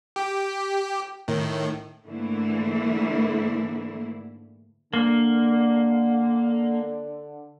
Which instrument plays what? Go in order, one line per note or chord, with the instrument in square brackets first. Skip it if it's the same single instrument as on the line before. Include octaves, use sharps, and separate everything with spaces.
[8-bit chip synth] G4
A2 D#3
[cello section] G#2 D3 E3 A3 A#3 E4
[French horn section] D3 [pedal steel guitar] A#3